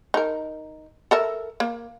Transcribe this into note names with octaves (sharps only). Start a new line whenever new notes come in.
D#4 A#4
A4 A#4 E5
A#3